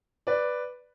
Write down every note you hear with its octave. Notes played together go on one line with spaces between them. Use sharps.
B4 D5